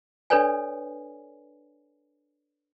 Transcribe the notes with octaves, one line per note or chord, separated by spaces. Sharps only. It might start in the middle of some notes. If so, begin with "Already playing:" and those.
D4 A4 B4 C#5 D5 G#5